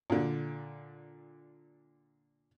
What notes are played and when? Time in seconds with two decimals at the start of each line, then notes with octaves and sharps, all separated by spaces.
0.10 A#2 D3